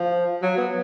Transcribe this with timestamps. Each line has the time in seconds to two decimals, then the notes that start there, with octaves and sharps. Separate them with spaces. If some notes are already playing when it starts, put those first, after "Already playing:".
Already playing: F3
0.43 F#3
0.57 B3